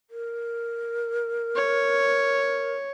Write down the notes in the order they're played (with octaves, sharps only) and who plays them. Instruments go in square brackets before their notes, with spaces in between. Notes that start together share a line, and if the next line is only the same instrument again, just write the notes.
[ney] A#4
[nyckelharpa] C#5